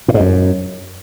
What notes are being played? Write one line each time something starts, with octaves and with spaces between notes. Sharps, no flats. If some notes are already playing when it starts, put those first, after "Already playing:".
A2
G#2
F#2